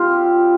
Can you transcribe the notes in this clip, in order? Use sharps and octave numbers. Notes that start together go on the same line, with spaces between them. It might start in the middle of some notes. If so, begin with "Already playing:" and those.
Already playing: G3 C4 F4 G4